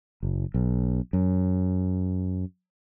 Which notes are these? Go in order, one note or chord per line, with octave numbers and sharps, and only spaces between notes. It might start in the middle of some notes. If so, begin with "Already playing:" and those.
F#1
B1
F#2